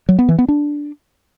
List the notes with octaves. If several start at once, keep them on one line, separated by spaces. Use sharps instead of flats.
F#3
B3
E3
B3
D4